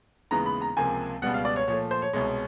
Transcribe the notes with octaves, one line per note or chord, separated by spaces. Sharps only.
D#2 C#3 E3 G#3 B3 A#5
B5
A#5
C#2 C3 F3 A#3 G#5
C#2 B2 G3 B3 F#5
F5
D5
C#5
A#2 F3 A3 C#5
C5
C#5
C2 B2 G#3 C#5